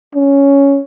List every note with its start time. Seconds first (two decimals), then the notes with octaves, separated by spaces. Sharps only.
0.15 C#4